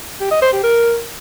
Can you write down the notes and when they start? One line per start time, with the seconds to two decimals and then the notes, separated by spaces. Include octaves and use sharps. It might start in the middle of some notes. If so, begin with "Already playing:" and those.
0.21 G4
0.31 D#5
0.42 C5
0.53 G4
0.63 A#4